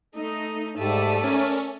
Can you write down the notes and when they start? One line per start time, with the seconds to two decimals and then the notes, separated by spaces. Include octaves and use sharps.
0.16 A3 D#4 D#5
0.78 G#2 G3 A3 D5 E5 A5 D#7
1.24 C#4 A#4